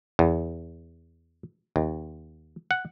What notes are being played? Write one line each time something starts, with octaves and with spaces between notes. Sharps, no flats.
E2
D#2
F#5